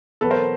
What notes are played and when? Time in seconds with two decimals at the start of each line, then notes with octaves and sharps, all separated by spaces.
0.21 E2 B2 F#3 A4 B4
0.30 A#4 C5